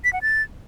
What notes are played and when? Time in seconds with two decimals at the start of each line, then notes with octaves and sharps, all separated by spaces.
0.04 B6
0.13 F#5
0.22 A6